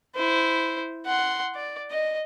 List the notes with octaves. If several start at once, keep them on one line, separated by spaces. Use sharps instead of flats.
E4 C5
F#5 C6
D5
D#5